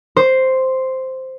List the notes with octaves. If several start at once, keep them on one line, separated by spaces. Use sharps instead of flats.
C5